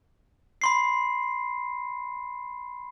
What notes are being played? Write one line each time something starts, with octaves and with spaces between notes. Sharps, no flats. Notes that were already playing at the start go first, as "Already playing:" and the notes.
B5 C6 C7